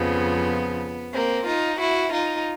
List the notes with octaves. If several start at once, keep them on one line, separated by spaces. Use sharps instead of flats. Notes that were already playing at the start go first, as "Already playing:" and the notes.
Already playing: F2 C#3 F3 B3
A#3 C4
D#4 F4
E4 F#4
D#4 F4